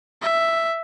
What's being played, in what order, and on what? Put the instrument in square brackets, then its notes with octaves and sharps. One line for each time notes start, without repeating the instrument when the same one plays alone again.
[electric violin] E5